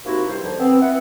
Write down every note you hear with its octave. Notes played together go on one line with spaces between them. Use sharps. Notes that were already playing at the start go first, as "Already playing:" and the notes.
C3 A#3 D#4 E4 F#4
G2 C5
D#2 D3 F3
B3 C4
E4 F#5